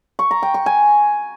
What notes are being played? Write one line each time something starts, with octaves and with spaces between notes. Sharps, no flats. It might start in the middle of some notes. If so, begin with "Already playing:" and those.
C#6
A#5
G5
C#6
G#5